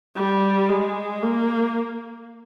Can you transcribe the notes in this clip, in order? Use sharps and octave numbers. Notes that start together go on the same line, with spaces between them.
G3
G#3
A#3